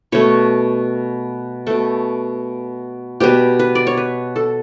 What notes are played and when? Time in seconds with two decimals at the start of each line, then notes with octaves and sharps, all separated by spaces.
0.12 B2 A3 C#5
1.67 B2 A3 A4
3.20 B2 G3 B3 G4
3.59 B4
3.75 D5
3.87 C#5
3.97 B4
4.36 A4